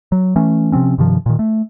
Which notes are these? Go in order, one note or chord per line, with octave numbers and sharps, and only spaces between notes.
F#3
E3 A3 C#4
C3 F3 C4 C#4
G2 C3 D#3 F3
A#2 D#3
A3